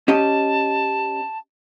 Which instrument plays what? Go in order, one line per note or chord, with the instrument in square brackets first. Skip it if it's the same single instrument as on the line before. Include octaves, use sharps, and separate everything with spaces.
[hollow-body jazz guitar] C#4 G4 D#5 [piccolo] A5